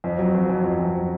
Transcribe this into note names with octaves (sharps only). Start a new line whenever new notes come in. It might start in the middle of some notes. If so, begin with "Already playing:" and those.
F2
F#3
F2
F2
F2
F2